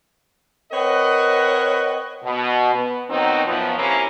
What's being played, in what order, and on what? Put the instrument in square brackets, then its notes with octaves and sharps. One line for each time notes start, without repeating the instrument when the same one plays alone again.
[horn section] C4 A#4 B4 C#5 D#5 F#5
[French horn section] B2
B3
B2 D#3 F#3 C4 D#4 F#4
F#2 F3 B3
C3 A#3 C#4 E4